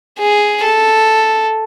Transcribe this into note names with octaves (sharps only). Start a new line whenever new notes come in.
G#4
A4